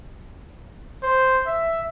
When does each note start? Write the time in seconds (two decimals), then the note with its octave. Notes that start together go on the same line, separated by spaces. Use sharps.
1.03 C5
1.47 E5